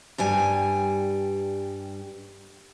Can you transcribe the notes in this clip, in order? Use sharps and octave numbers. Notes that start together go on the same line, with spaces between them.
G2 G3 G#5